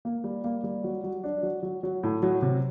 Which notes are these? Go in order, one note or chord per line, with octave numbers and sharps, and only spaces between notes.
A#3
G3
A#3
G3
F#3
F#3
D4
F#3
F#3
F#3
A2
F#3
C3